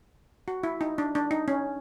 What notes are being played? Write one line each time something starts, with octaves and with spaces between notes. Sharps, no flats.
F#4
E4
D#4
D4
D4
D#4
C#4